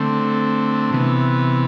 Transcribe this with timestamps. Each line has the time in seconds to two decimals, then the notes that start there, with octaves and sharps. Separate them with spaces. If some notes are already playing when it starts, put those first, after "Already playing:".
Already playing: D3 A3 C4
0.91 C3 E3 B3